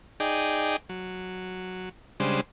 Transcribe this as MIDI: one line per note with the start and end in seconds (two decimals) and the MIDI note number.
0.20 0.76 63
0.20 0.76 68
0.20 0.76 74
0.20 0.76 79
0.89 1.89 54
2.20 2.41 49
2.20 2.41 55
2.20 2.41 56
2.20 2.41 62
2.20 2.41 72